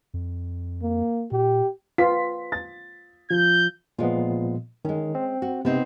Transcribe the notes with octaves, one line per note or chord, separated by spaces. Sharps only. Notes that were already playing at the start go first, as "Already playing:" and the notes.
F2
A#3
A#2 G4
F4 B4 B6
A6
F3 G6
A#2 F3 G#3 B3 F4
D#3 G#3 C#4
C4
F#4
C3 B3 C4 D#4